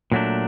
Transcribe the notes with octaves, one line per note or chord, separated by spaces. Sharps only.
A#2 F#3 A3 D4